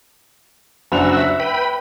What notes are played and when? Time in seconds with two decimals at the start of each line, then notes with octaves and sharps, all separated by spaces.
0.92 F#1 D4 F#4 F#5 E6 F7
1.17 E5
1.40 B4 G5 B5